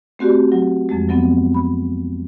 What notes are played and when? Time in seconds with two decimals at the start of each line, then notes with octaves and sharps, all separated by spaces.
0.19 A3 C4 F#4 G4 D5
0.52 F#3
0.89 F2 F3 G#3
1.08 F3 F#3 B3 C4
1.54 B5